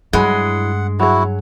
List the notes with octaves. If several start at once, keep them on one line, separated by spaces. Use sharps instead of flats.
G2 F#3 G#3 E4 F#5 G#5
F#3 E4 F#4 G#4